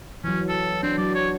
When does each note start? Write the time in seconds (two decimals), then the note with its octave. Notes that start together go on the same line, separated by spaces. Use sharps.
0.24 E3 F#3 C#4
0.49 A4
0.83 C4 D4
0.98 F#3 D5
1.15 C#5